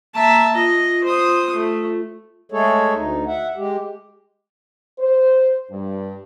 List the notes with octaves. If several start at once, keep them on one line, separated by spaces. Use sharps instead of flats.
A#3 E5 A5 A#5
F4 D#5
C5 D#6
A3
G#3 A3 G#4 A4 C#5
D2 D#4
E5 F#5
G#3 G4
C5
G2